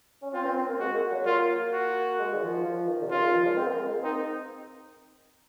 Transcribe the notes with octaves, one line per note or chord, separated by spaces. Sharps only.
C#4
C4 F4
C4
C4
A#3
G#3 F#4
A#3
F#3
A#3 F4
F#4
G#3
D#3
F3
F3
D#3
C3
C#3 F4
D#3
F3
G#3
C4
A#3
G#3
A#3
C4 D#4